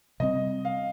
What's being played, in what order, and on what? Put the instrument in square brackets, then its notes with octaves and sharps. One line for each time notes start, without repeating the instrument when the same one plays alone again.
[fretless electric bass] C3 G3 C4 [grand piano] D#5
[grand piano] F5